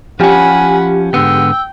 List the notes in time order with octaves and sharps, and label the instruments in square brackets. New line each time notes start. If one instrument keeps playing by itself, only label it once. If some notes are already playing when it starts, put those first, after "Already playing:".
[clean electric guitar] F3 C#4 [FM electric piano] G4 [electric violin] F#5 B5 [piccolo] G#5
[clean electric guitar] G#2 D3 B3 [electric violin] G5 [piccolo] E6